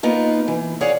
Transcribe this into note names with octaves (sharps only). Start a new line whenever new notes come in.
A#3 B3 D#4 F4
E3
G#4 C#5 D5 F5 F#5